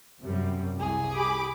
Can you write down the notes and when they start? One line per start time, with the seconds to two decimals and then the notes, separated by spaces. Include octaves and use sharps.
0.23 F#2 C3 G3
0.80 C2 G#4
1.14 G4 B5 D6